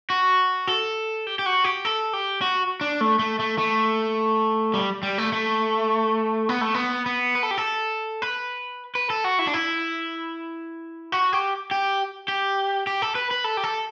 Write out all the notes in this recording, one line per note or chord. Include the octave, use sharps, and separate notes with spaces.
F#4
A4
G4
G4
F#4
G4
A4
G4
F#4
D4
A3
A3
A3
A3
G3
G3
A3
A3
B3
A3
B3
B3
B4
A4
G4
A4
B4
B4
A4
F#4
E4
D4
E4
F#4
G4
G4
G4
G4
A4
B4
B4
A4
G4
A4